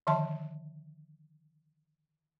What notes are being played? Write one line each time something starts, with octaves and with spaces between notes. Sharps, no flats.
D3 D#3 F3 E5 A5 C6